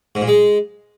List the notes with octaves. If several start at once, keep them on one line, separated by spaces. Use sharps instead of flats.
G#2
A#2
G#3